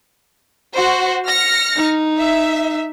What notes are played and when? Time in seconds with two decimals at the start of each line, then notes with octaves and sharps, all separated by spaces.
0.74 F#4 C5
1.26 F6 A#6 C#7
1.77 D#4
2.18 E5